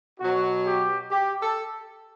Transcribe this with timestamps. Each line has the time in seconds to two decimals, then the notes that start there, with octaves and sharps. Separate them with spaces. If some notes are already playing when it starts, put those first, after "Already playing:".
0.20 B2 F#3 F#4
0.66 G4
1.11 G4
1.43 A4